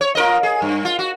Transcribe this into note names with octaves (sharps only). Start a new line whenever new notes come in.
C#5
F4 A#4 D#5
G#4
G2
F4
F#4